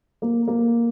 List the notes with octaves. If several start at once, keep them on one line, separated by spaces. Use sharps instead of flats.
A#3
A#3